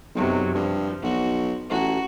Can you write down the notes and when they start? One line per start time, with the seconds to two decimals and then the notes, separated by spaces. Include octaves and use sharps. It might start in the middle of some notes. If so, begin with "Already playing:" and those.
0.15 B1 F#2 C3 F#3
0.55 G2 F3
1.03 B1 F#4
1.71 A1 F#4